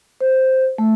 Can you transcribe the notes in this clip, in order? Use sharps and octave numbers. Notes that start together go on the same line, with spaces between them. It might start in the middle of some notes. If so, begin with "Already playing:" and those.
C5
A3